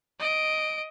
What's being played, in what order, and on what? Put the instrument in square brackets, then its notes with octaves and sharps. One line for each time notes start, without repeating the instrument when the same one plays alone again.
[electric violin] D#5 D7